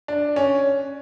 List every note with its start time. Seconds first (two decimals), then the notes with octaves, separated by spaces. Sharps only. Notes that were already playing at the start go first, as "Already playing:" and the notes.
0.08 D4
0.36 C#4